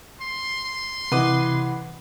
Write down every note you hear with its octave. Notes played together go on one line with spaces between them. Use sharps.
C6
C3 E3 B4 D#5 F#5 D6